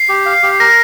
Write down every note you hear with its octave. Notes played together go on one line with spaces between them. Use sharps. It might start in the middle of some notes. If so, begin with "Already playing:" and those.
Already playing: C7
G4
F5
G4
A#4 A#6